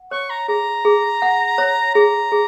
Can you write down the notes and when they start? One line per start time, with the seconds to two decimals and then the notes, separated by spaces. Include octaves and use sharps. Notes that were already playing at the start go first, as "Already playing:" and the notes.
Already playing: F#5
0.11 C#5 C#6
0.30 A#5
0.48 G#4 A#5
0.85 G#4
1.22 F#5
1.58 C#5
1.95 G#4 A#5
2.32 G#4